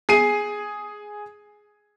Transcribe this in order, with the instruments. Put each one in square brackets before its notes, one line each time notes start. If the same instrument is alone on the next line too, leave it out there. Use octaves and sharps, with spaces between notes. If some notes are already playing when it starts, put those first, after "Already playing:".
[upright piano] G#4 C7 D#7